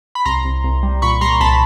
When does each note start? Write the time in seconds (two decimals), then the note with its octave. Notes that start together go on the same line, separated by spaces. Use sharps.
0.15 B5
0.25 C2 A#5 C6
0.45 C2
0.64 C2
0.83 G3
1.02 A#2 B5 C#6
1.21 G3 A#5 C6
1.40 C2 A5 B5